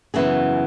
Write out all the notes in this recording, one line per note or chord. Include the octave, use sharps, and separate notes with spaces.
F#2 C#3 E3 B3 G#4